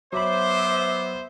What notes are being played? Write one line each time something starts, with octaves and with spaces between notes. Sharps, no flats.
F#3 B3 C5 E5 B5 D6